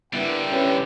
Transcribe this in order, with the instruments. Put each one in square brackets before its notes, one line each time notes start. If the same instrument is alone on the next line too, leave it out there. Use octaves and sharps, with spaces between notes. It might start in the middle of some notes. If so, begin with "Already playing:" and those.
[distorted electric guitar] D3 G3 [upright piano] B3 D4 E4 [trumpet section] A#4 G5
[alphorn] C#4 [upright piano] E4 G4 B4